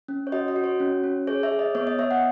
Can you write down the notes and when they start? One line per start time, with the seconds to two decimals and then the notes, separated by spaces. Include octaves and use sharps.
0.08 C#4
0.27 C#5
0.32 F#4 D#5
0.48 D#5
0.56 F#4
0.64 C#5
0.80 C#4
1.04 C#4
1.27 G#4 C#5
1.43 C#5 E5
1.51 G#4
1.59 D#5
1.75 B3 C#5
1.87 D#5
1.99 B3 C#5 E5
2.11 D#5 F#5